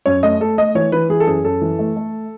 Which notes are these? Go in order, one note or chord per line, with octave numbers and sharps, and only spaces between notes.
F#2 C#5
A3 D#5
A3 A4
A3 D#5
E3 C#5
E3 B4
E3 G#4
A4
F#2 G#4
F#2 A4
E3
A3
A3